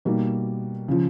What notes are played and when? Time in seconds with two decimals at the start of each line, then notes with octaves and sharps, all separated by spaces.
0.05 B2 G3 A#3 D#4
0.88 C#3 F3